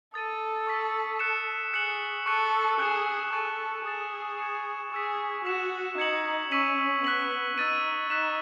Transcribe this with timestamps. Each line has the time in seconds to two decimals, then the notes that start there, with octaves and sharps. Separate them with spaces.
0.14 A4 D#6 A6 D#7
0.67 C#6 E6 B6
1.19 F#6 C#7 E7
1.73 G#4 F#6 C#7 F#7
2.26 A4 C#6 F#6 C#7
2.79 G#4 F#6 C#7 E7
3.33 A4 C#6 F#6 C#7
3.85 G#4 D#6 A6 E7
4.39 D#6 G#6 C#7 E7
4.91 G#4 C#6 E6 B6
5.44 F#4 E6 B6 E7
5.98 D#4 G#6 C#7 F#7
6.51 C#4 C#6 E6 B6 D#7 F#7
7.04 B3 F#6 B6 F#7
7.58 D#4 E6 A6 D#7
8.10 D#4 F#6 B6 E7